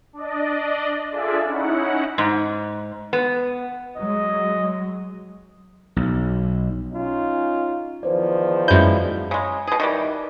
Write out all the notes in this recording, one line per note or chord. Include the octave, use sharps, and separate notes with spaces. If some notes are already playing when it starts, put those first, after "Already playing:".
D4 D5 D#5
D4 F4 G#4 A4 D5 E5
C#4 D#4 E4 F#5
G#2
B3
F#3 G#3 D#5
B1
C#4 D#4 F4
E2 D#3 F3 B4 C5 D5
F#2 G#3 E4 G6
C#3 G#3
B2 G#4
D#3 E3 G3